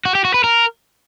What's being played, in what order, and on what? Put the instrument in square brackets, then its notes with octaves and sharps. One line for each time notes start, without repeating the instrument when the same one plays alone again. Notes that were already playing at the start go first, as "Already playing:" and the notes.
[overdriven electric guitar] F#4
G4
F#4
B4
A#4